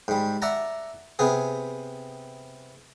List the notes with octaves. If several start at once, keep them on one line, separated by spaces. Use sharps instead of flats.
G#2 G3
D5 E5 F#5 A5 A#5
C3 B3 G#4